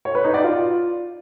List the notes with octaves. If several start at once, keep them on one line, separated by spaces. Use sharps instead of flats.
C#5
B4
D#4
D5
F4